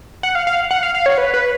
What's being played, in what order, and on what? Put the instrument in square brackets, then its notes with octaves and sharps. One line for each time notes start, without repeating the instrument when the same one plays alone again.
[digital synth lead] F#5
F5
F5
F#5
F5
F5
C#5
B4
B4